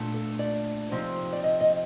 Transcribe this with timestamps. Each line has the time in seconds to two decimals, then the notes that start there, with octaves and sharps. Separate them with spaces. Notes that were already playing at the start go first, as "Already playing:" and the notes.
Already playing: A#2 A3 D4
0.14 A4
0.39 D5
0.91 C3 F3 C4 D#4
1.33 D5
1.44 D#5
1.61 D#5